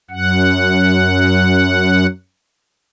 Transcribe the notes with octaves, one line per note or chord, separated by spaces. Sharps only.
F#2 F#5